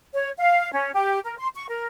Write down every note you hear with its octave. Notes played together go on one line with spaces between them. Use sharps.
C#5
F5
C#4
G4
A#4
C6
C#6
A#4